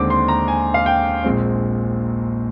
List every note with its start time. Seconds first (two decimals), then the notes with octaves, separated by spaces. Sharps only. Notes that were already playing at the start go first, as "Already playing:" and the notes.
Already playing: D#2 D3 G#3 C4 D6
0.10 C6
0.28 A#5
0.48 G#5
0.74 F5
0.86 G5
1.24 A#1 A#2 G#3 C4